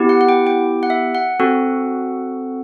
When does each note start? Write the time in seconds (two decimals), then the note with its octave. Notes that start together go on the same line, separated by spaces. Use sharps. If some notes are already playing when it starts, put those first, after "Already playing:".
Already playing: B3 E4 G4
0.09 F#5
0.21 F#5
0.29 G5
0.47 G5
0.83 F#5
0.90 E5
1.15 F#5
1.40 C4 F#4 A4